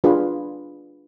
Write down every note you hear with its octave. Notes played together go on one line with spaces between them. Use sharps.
D4 F4 G#4 B4